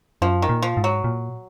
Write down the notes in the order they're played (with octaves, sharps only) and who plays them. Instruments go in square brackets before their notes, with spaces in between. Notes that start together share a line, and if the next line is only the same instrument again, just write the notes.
[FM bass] F#2 [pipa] F3
[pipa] D#3
[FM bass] A#2
[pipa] F3
[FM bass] G#2
[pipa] F#3
[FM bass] A#2